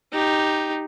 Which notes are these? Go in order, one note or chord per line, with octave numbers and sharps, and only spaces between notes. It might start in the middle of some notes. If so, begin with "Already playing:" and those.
D#4 G4